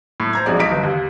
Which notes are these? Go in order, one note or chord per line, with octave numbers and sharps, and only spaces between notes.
A2
C5 A#5 G#6
A#1 G#3 D5
B1 D#4 A#5 B6 D7
G1
D#2